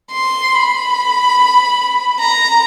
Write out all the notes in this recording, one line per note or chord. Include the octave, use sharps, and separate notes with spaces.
C6
B5
A#5